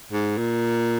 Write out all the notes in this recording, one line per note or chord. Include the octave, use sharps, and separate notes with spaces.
G#2
A#2